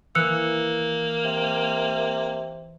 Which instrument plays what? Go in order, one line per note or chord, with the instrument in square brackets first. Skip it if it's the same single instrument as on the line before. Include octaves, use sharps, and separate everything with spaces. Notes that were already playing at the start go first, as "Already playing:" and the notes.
[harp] E3 [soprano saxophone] A#3 [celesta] E6 F#6 C#7
[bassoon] C3